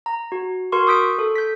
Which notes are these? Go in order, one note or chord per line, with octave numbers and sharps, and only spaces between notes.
A#5
F#4
F#4 A#4 C6 C#6
C#6 D#6 E6 G6 B6 D7
A4
G6 B6